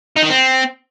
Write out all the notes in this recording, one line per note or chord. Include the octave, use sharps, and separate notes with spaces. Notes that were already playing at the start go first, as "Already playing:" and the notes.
D#4
D#3
C4